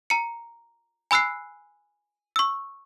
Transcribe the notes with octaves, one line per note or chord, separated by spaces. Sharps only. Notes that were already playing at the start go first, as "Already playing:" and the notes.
A#5 C#7
G#5 B5 E6 F#6 C7
C#6 E6